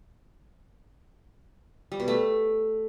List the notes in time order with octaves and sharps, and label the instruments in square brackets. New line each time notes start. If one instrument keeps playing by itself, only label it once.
[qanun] G3
B2
A3